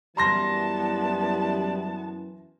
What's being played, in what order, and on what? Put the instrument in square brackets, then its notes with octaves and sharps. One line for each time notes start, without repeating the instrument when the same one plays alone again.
[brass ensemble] F#2 E3 [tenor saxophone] G3 [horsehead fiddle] B3 A5 [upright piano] A#5 C6 A#6